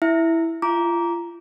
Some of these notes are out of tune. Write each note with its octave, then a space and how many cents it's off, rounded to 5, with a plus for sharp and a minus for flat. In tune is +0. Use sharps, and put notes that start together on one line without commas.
E4 +0 E5 +0
F4 -35 A#5 +5 D6 -20